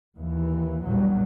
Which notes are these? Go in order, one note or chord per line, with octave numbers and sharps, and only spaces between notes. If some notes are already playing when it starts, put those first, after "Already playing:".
D#2 E3
A#1 E2 A#2 F#3 G3